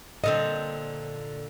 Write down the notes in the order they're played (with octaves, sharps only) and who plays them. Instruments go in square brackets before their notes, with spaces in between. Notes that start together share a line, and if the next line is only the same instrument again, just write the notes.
[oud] A#2 D3 C4 [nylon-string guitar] D#5